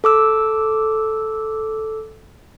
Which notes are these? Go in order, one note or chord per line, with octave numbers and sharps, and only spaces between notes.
A4 D6 E6